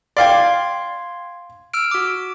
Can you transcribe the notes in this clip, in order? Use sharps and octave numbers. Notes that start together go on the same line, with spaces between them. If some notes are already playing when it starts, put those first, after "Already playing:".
D5 F5 G5 C6 G#6
E6 F6 D7
F#4 D6